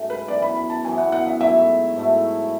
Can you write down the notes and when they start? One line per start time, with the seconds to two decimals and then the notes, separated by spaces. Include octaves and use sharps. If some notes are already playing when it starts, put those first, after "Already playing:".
Already playing: G#2 F#3 A3 C#4
0.10 B4
0.28 F#2 E3 B3 D5
0.42 B5
0.57 B5
0.70 A5
0.84 F#2 E3 B3 G#5
0.98 F#5
1.12 F#5
1.26 E5
1.40 G#2 F#3 A3 E4 E5
1.96 G#2 F#3 A3 E4